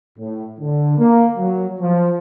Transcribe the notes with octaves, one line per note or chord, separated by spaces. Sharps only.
A2
D3
A#3
F#3
F3